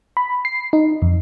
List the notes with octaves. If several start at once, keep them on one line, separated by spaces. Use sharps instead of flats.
B5
C7
D#4
F2